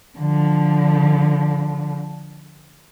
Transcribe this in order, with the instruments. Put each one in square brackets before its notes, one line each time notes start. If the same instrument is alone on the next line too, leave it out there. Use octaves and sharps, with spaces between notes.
[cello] D3 F3